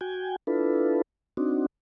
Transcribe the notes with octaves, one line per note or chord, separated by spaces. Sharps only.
F#4 G5 G#5
D4 E4 F4 A4 B4
C4 D4 D#4 F#4